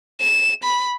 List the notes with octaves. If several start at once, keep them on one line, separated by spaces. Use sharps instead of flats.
E7
B5